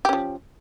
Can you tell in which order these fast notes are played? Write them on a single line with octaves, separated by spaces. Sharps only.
G4 C#4 F3